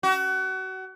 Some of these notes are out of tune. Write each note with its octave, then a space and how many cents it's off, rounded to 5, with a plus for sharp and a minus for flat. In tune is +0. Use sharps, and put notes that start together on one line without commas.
F#4 +30